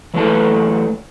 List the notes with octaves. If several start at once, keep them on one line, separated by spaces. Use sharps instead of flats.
E3 F#3 A3 E4 A4 A5